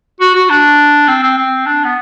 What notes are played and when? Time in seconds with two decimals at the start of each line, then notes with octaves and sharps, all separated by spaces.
0.20 F#4
0.35 F#4
0.49 D4
1.08 C4
1.23 C4
1.37 C4
1.66 D4
1.84 B3